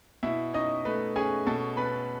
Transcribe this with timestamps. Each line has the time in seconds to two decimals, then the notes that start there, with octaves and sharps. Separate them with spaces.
0.23 B2 E4 E5
0.53 C#4 D#4 D#5
0.85 A3 B4
1.16 C#4 G#4 G#5
1.46 B2 A4 A5
1.77 B2 B4 B5